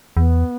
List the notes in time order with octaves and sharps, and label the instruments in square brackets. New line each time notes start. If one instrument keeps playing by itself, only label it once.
[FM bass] E2 [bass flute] B3